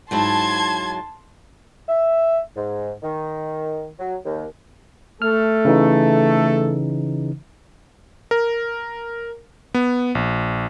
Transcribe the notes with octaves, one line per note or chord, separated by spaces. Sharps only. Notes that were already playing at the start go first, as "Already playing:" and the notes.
G#2 F#3 E4 A5 C6 G#6
E5
G#2
D#3
F#3
D#2
A3 A4 F6
C#3 E3 D#4
A#4
B3
A#1